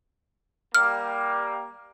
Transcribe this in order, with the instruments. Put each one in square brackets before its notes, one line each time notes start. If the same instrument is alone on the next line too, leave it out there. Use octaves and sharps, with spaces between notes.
[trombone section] G3 A#3 [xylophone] F6